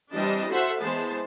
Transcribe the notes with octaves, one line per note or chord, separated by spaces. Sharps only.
E3 G3 C4 D4 D#5 A5
F#4 A4 C5 E5 F#5 C6
E3 G#3 B3 G#4 C5 A5